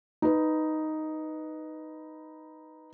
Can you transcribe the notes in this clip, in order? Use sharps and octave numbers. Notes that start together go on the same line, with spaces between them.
D#4 B4